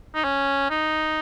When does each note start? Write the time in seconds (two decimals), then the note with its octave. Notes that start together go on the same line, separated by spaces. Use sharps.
0.15 D#4
0.24 C#4
0.70 D#4